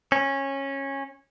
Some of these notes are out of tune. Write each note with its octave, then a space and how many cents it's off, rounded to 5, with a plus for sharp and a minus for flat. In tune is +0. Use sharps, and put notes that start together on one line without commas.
C#4 -15